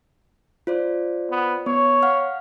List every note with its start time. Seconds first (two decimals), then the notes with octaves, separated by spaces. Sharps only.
0.67 F4 C5 D5
1.31 B3
1.66 B3 C#5
2.03 F5 F#5 F6